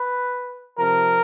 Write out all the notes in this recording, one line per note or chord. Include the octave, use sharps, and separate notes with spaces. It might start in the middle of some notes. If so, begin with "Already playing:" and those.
Already playing: B4
C3 F3 A#4